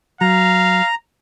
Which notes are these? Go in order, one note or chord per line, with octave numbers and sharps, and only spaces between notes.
F#3 F5 A#5